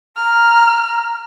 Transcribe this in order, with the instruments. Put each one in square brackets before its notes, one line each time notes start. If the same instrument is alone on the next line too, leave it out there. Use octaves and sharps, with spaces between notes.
[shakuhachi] A#5 [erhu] F6